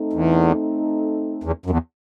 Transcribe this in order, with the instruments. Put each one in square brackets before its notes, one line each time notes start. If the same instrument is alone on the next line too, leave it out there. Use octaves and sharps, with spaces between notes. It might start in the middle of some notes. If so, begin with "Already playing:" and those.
Already playing: [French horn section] A3 C4 D#4 A4
[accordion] E2
E2
F#2
E2